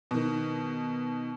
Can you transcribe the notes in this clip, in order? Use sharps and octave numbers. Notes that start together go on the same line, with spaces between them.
B2 D#3